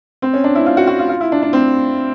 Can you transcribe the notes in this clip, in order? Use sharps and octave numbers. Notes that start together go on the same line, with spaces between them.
C4
C#4
D4
E4
F4
F#4
F#4
F4
F4
E4
D4
D4
C4